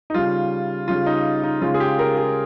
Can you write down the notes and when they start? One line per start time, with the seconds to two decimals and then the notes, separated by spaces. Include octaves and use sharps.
0.10 D#4
0.14 C#3 G3 F4
0.88 C#3 G3 F4
1.06 D#4
1.44 D#4
1.62 C#3 G#3 F4
1.74 G#4
1.80 G4
1.99 A#4
2.17 G#4